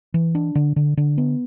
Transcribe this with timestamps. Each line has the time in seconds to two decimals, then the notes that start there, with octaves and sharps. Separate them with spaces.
0.14 E3
0.35 D4
0.55 D3
0.76 D3
0.97 D3
1.18 B3